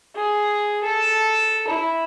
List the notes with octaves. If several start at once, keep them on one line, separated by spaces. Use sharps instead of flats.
G#4
A4
E4